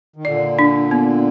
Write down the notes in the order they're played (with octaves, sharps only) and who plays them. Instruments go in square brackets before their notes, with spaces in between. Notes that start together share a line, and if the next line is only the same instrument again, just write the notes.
[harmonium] D#3
[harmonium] A#2 D3 [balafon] D5
[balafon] D4
B3